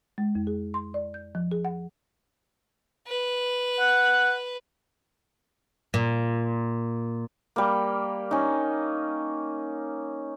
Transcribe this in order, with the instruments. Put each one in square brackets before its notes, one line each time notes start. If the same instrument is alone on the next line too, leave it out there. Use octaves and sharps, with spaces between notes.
[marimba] G#3
F2
G#4
C6
D5
G6
F3
G#4
F#5
[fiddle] B4
[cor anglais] F#5
[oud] A#2
[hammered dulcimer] G3 A#3
C#4 D#4